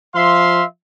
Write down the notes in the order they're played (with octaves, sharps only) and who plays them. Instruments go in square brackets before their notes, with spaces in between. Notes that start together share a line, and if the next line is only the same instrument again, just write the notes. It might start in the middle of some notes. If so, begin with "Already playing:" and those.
[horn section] F3 E5 F5 C6